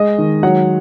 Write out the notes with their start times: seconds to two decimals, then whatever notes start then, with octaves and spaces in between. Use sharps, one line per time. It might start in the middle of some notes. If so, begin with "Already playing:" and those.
Already playing: G#3 D#5
0.18 D#3
0.43 F#3 F#5